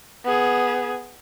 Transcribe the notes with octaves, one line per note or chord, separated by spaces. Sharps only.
B3 G#4